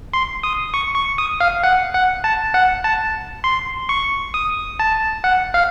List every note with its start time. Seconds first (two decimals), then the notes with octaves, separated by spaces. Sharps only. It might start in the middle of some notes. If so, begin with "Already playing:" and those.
0.13 C6
0.43 D#6
0.74 C#6
0.96 C#6
1.18 D#6
1.40 F5
1.64 F#5
1.94 F#5
2.24 A5
2.54 F#5
2.84 A5
3.44 C6
3.89 C#6
4.34 D#6
4.79 A5
5.24 F#5
5.54 F5